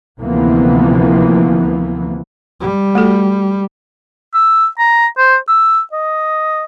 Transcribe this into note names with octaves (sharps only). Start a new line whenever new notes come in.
D2 C3 E3 F3 A#3 B3
G3
A3 F#4 A4
E6
A#5
C5
E6
D#5